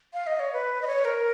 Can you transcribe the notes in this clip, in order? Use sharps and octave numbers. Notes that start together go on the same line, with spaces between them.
F5
D#5
C#5
B4
D#5
C#5
A#4